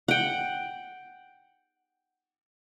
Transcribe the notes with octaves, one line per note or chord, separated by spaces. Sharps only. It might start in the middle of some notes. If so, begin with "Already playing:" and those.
F#5 G5